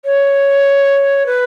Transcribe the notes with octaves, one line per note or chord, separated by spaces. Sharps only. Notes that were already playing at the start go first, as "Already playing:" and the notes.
C#5
B4